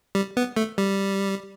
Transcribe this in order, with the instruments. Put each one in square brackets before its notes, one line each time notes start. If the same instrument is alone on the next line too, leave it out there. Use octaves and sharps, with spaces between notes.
[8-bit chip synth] G3
B3
A3
G3